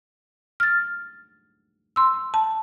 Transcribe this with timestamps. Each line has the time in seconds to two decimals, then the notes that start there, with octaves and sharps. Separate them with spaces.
0.60 F6 A6
1.96 C6 E6
2.34 A5